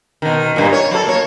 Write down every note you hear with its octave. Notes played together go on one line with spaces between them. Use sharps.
B2 D#3
G2 A#2
C#5
F#3 A4
A#3 C#5